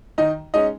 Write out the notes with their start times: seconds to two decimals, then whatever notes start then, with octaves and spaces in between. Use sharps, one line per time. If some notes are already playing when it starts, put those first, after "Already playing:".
0.18 D#3 D#4 D#5
0.54 G#3 C#4 D#4 D#5